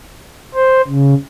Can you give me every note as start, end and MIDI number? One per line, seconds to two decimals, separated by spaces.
0.55 0.82 72
0.88 1.15 49